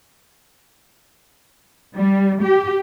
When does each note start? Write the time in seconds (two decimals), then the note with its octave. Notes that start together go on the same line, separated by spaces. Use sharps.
1.94 G3
2.41 G4